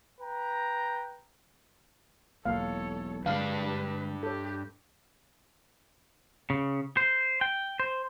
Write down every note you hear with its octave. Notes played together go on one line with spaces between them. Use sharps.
B4 G5 A#5
E1 B1 E2 A#3 A4 C#5 F5
G2 D3 G#3 D4 B4 F5
G4 A4 C#5
C#3
C5
G5
C5